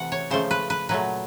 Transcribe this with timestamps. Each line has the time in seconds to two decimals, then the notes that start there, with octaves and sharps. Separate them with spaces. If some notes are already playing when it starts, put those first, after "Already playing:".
Already playing: C3 E3 A3 F#5
0.12 C#5
0.30 C#3 F3 A3 C5
0.51 B4
0.70 B4
0.89 A#2 F#3 A3 B4